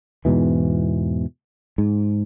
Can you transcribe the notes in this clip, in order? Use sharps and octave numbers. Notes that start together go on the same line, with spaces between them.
E2 G#2 B2 E3
G#2